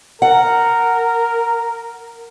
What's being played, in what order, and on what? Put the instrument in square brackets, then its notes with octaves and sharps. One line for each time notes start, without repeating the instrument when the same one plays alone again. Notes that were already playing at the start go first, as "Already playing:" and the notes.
[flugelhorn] A#4 [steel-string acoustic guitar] F#5